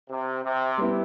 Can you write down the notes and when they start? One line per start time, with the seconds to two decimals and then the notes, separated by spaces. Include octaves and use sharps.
0.10 C3
0.44 C3
0.78 G3 B3 E4